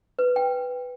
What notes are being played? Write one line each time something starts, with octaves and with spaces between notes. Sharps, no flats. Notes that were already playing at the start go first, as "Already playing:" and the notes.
B4
G5